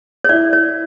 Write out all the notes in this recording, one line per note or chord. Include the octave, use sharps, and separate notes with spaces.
C#5
E4 D5
C#5